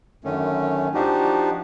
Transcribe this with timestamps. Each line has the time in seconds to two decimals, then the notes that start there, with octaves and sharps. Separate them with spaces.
0.24 F#2 D3 D#3 A3 C#4
0.94 F3 D4 D#4 F#4 G4